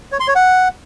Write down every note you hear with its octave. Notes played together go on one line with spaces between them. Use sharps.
C#5
C6
C#5
F#5